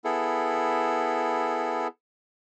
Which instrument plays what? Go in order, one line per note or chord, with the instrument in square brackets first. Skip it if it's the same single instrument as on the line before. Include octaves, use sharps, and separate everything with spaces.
[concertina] B3 E4 G#4 A4